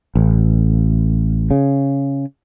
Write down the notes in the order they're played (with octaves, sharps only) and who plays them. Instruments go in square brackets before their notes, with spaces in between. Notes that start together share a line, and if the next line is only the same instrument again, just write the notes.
[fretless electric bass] A1
C#3